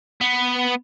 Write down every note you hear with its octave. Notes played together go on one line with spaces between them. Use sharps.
B3